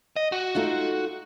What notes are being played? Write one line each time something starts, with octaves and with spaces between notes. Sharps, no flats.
D#5
F#4
A3 D#4 F4